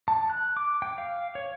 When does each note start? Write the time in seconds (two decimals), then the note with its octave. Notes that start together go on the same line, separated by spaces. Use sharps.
0.08 A5
0.30 F#6
0.57 D6
0.82 G5
0.98 F5
1.35 C#5